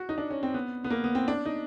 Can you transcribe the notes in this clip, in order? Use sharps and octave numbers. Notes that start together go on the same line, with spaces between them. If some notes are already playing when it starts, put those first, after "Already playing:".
Already playing: F#4
D#4
D4
C#4
C4
B3
B3
A#3
B3
C4
D4
D#4